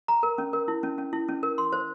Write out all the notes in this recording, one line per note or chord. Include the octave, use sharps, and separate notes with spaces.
A#5
A#4
C#4
A#4
E4
C#4
C#4
E4
C#4
A#4
C6
C5